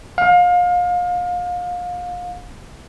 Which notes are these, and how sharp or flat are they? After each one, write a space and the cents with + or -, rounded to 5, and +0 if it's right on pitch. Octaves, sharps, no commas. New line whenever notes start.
F5 +30